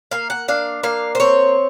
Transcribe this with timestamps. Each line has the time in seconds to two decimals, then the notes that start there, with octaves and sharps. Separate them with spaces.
0.11 A#3 F5
0.30 F#5
0.48 D4 F5
0.83 A#3 F5
1.15 C5
1.20 C4 C#5